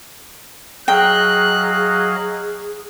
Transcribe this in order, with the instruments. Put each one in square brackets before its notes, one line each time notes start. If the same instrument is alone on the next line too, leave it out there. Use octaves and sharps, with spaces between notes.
[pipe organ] F#3 D#5 F5 [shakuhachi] G#4 [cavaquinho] G5 [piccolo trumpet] F#6